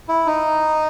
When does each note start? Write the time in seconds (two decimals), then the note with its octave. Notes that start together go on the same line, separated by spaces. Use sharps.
0.09 E4
0.26 D#4